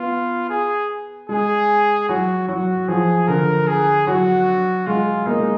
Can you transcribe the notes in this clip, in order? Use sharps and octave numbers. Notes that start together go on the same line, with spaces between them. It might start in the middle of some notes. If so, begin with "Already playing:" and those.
Already playing: B3 F4
G#4
G#3 G#4
F#3 F#4
F#3 F#4
F3 G#4
D3 A#4
G#4
F#3 F#4
G#3 F4
A#3 D#4
G#3